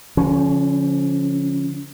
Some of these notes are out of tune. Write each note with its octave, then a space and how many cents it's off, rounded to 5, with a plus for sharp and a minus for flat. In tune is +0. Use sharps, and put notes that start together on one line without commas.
D3 -45 F3 +0 C#4 -5